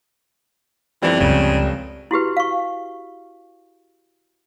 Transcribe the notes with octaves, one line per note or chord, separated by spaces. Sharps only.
G1 E3 F3 G3 C4
C#2 F#2 C#3
E4 F#4 G4 B4
F5 C#6